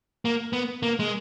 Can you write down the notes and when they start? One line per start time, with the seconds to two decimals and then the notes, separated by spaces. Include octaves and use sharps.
0.25 A#3
0.53 B3
0.83 A#3
0.99 G#3